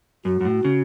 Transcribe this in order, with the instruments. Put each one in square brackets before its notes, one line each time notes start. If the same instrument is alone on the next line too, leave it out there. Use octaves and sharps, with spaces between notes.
[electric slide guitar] F#2 [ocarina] F#4
[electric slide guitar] F#2
A2
C#3